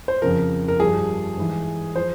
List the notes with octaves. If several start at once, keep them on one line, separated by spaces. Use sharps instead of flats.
C5
F2 C#3 F3 A#4
A#4
G2 F3 G#4
G#2 E3
F3 C5